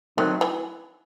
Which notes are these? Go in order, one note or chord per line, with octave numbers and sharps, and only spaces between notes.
D#3 F#3 A3 C4 D#4
E3